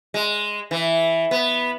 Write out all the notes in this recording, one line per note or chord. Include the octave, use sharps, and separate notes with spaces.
G#3
E3
B3